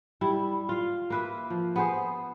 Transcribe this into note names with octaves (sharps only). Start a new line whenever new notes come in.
G3 E4
F4 F5
A#3 B4 E5
F3
B3 G#4 C5